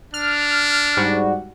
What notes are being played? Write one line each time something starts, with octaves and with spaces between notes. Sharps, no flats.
D4 F6
G#2 G3 F#4